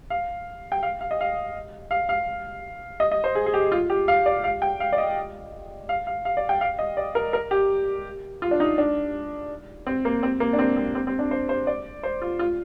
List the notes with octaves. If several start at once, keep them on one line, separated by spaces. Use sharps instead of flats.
F5
G5
F5
F5
D#5
F5
F5
F5
D#5
D#5
C5
G#4
G#4
G4
F4
G4
F5
D5
F5
G5
F5
D5
D#5
F5
F5
F5
D5
G5
F5
D#5
D5
A#4
A#4
G4
F4
D4
D#4
D4
C4
A#3
C4
A#3
D4
C4
C4
C4
C4
D4
C5
C5
D5
C5
F4
F4